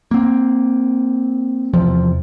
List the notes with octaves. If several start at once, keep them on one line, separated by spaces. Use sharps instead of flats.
A#3 C4
E2 C3 F3